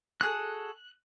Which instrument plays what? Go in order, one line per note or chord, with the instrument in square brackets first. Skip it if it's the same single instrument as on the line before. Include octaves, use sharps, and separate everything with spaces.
[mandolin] F#4 G#4 A4 [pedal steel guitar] F#6